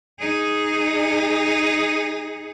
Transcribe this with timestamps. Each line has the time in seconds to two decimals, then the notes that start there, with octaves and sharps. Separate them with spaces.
0.19 D#4 G#4